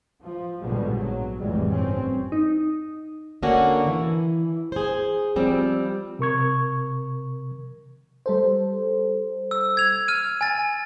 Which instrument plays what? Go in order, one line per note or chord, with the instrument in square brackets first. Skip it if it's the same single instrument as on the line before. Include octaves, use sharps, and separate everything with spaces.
[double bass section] F3
A#1 G#2 B2 D3 G3 G#3
F#3
F1 F2 A2 E3 G3 G#3
G2 C4 C#4
[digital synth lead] D#4
[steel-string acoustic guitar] D3 A#3 C#4 D4 F#4
E3
G#4 C5
F3 G3 C4
[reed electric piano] C3 A#4 C#6 G#6
[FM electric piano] G3 A4 C5
[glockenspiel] E6
G#6 F7
F6 D#7
G#5 A6